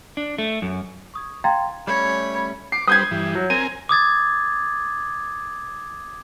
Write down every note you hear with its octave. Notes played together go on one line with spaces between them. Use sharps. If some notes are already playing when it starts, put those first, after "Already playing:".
D4
A3
F#2
C#6 D#6 G#6
F5 G5 A#5 C6 G#6 A6
G3 A3 C#4 C#5 B5
D6 C7
G3 B4 C5 D#6 G6 G#6
G2 E3
F#3
C4 A#4 G#5 D#7
D6 D#6 G#6 A6